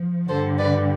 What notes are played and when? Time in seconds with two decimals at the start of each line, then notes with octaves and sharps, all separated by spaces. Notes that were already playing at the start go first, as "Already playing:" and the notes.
Already playing: F3
0.27 G2 D3 G3 A4 C5
0.58 B4 D5